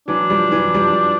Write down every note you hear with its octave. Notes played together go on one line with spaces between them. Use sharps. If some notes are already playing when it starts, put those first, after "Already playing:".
E3 F#3 D4
F3 G3
E3 F#3
F3 G3